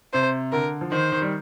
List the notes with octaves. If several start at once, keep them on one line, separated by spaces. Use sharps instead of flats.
C3 C5
D3 A#4
F3
D#3 C5
D#3
G3